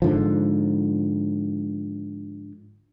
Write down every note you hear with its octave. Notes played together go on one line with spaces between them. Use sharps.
G#2 D3 F3